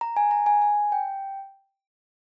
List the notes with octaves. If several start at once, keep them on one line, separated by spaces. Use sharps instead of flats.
A#5
G#5
A#5
G#5
G#5
G5